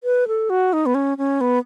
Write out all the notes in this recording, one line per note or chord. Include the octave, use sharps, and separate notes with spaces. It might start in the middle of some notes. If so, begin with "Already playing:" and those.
B4
A4
F#4
D#4
B3
C#4
C#4
B3